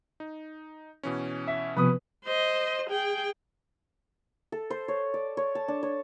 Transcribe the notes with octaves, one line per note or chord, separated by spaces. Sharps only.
D#4
B2 E3 C#4
E5
C3 F3 B3 B4 D#6
C5 D#5
G#4 G5
A4
C5
C#5
D5
C#5
A5
D4
C#5